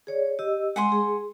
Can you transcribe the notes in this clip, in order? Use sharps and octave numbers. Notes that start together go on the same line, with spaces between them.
G#4 C#5 D5
G4 D#5 E6
G#3 F#5 G#5 C6
G#4